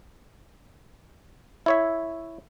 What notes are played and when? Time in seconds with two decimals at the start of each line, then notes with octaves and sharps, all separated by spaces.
1.66 E4 C#5 E5